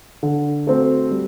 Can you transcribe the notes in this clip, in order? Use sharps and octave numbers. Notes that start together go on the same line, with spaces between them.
D3
A3 C4 F#4
G3